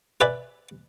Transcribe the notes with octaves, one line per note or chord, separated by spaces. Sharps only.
B4 D5 E5 G#5 B5